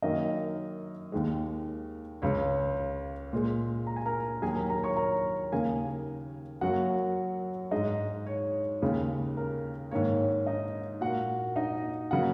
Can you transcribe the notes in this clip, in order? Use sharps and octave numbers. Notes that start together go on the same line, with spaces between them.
F#2 D#3 A#3 D#4 D#5
D#2 D#3 G#3
C#2 C#3 G#3 C#5
A#2 G#3
A#5
G#5
A#4 A#5
D#2 D#3 F#3 G#4 G#5
A#4 A#5
A#4 A#5
C#5 C#6
A#4 A#5
D#2 C#3 A#3 G#4 G#5
F#2 F#3 A#3 F#4 F#5
G#2 G#3 D#4 D#5
C#5
D#2 C#3 G#3
A#4
G#2 D#3 A#3 C#5
C#5
D#4 D#5
A#2 A#3 F#4 F#5
D#4 D#5
C#3 F#3 A#3 F#4 F#5